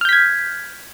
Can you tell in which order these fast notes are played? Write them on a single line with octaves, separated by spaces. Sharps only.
F6 G6 B6 G#6